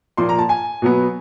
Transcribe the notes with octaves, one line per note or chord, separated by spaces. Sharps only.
A#2 F3 A#3 C6
A#5
A5
G#5
B2 F#3 B3